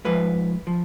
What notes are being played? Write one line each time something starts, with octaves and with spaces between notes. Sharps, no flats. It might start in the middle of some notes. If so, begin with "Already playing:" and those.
G#2 F3 B4
F3